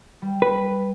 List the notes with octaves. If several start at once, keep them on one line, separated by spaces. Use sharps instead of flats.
G3
B4